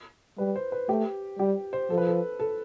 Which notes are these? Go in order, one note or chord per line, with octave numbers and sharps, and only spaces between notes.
G3 B4
C5
B4
A3 G4
G3 G4
C5
F3 A4
B4
A4
A4